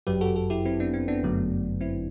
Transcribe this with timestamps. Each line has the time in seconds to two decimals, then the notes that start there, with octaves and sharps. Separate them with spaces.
0.07 G1 F#2 F#3 G4 B4
0.21 F#4 A4
0.36 F#4 A4
0.50 E4 G4
0.65 C4 E4
0.80 B3 D4
0.94 C4
1.08 B3 D4
1.23 G1 F#2 D3 F#3 A3
1.81 C4 E4